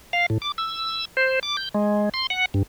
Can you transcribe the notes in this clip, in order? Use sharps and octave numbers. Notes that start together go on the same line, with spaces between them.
F5
A2
D6
E6
C5
D6
G6
G#3
C6
F#5
G2